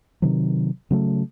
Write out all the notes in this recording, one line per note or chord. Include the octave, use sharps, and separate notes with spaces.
C3 D#3 F#3
C#3 F#3 A3